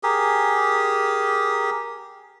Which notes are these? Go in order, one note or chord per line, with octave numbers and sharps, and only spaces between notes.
G4 G#4 A#4